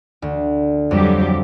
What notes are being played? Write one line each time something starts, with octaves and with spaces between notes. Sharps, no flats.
D2
F2 F#3 G3 G4